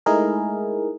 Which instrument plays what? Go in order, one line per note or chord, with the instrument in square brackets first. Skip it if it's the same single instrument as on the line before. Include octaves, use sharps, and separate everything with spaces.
[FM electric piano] G#3 A3 D#4 E4 G#4 A#4